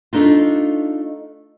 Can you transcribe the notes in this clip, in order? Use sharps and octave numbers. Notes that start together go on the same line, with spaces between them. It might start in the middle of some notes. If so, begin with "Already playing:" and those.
A3 D4 D#4 F4